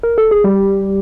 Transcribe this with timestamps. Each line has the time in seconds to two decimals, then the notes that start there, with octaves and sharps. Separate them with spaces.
0.03 A#4
0.18 A4
0.31 G#4
0.44 G3 G4